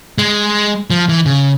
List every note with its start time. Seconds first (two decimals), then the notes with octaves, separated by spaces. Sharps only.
0.18 G#3
0.90 F3
1.09 E3
1.26 C#3